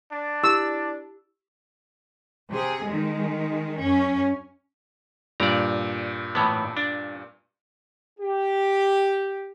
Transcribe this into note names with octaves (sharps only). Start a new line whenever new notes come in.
D4
E4 G4 E6
C3 G#4
D#3 G#3
F#2 C#4
G2 A#2 D5 A#5
A2 E3 B3
D4
G4